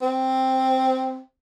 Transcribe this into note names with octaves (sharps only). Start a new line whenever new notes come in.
C4